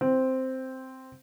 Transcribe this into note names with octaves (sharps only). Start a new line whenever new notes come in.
C4